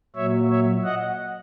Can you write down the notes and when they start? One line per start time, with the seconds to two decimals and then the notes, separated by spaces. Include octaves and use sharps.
0.15 A#2 F#3 C#5 E5
0.49 C#5 E5
0.84 D#5 F#5